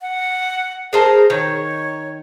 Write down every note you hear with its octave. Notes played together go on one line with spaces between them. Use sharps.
F#5
G#4 A#4 C5 A5
D#3 C#5